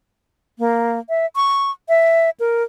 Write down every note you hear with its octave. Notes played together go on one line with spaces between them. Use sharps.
A#3
E5
C#6
E5
A#4